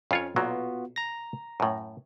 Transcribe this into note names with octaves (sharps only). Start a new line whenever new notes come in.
F2 C#4 F4 C#5
B1 A#2 F#3 B3 F4 F#4
A#5 A#6
F#2 A2